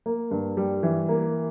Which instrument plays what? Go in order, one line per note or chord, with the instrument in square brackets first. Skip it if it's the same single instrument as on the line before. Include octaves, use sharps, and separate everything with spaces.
[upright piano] A#3
G2
G3
E3
A#3